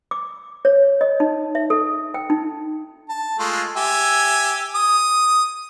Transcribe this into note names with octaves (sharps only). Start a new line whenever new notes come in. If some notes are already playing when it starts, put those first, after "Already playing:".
D6
C#5
D#5
D#4
E5
A4
G5
D#4
A5
G#3 A3 F4
G4 E5 G#5
D#6